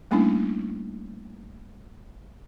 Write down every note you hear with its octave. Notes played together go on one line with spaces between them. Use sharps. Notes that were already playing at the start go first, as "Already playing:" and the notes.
G3 A3 A#3 C#4 D4 E4